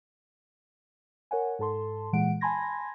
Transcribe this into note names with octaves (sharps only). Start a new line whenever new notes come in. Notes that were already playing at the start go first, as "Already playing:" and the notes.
A#4 C#5 F#5 G#5
G#2 A4 A5 C6
A#2 E3 G#3 F#5 D7
G#5 A5 B5 C6 G#6 A#6